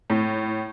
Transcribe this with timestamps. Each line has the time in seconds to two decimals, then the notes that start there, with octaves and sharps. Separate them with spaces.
0.10 A2